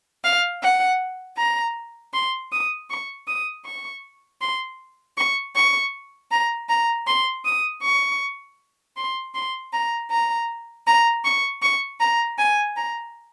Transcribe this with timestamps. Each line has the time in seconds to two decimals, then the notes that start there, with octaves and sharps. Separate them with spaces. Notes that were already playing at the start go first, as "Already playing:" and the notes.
0.24 F5
0.62 F#5
1.38 A#5
2.14 C6
2.52 D#6
2.90 C#6
3.27 D#6
3.65 C#6
4.41 C6
5.17 C#6
5.55 C#6
6.31 A#5
6.69 A#5
7.07 C6
7.45 D#6
7.83 C#6
8.96 C6
9.34 C6
9.73 A#5
10.11 A#5
10.87 A#5
11.24 C#6
11.62 C#6
12.00 A#5
12.38 G#5
12.76 A#5